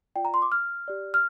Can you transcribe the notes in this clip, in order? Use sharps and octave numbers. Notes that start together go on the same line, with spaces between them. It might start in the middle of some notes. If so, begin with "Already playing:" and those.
F4 D5 G5
A#5
C6
D6
F6
G4 D5
F6